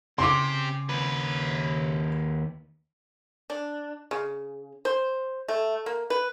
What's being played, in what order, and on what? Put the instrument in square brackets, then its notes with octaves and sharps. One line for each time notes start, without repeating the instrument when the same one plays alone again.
[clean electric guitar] C#3 [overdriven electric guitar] C4 G4 [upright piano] C6 D6
[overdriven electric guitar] D#2 B4
[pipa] D4
C#3
C5
A3
A#3
B4